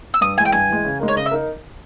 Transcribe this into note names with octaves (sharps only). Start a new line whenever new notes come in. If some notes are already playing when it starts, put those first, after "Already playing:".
E6
G2 D#6
E3 G#3 G#5
G5
G2 G#5
E3 G#3
C#3
G#3 D#4 A#4
C#5
C#3 D#5
E5
D#4 A#4